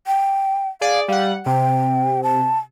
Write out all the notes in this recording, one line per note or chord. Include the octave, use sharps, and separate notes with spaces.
G5
G#4 D5 F5
G3 F5 F#5
C3 G5
A5